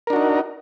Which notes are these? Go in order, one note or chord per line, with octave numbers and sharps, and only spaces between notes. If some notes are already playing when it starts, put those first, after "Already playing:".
D4 D#4 F#4 A#4